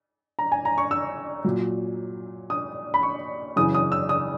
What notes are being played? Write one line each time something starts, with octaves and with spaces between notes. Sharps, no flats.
A#5
G#5
A#5
C#6
E6
A#2 F#3
D#6
B5
C#6
F#2 C#3 E3 D#6
D#6
E6
D#6